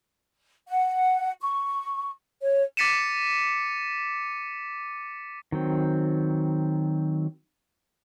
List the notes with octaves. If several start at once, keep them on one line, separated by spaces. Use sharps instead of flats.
F#5
C#6
C#5
D6 A6 B6 C#7 D#7 E7
D#3 F#3 C4